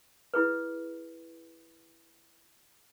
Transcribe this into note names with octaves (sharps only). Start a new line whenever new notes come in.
E4 G#4 B4